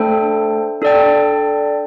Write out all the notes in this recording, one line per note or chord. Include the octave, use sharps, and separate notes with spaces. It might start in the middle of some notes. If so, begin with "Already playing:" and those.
Already playing: A3 D4 A4 C5 G5
D4 A4 D5 G5